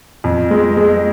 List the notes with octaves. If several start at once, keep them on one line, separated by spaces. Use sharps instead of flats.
F2
G#3
G#3